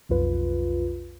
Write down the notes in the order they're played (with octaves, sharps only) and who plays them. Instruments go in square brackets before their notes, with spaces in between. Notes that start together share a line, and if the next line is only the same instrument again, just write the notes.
[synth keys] B1 F2 F4 B4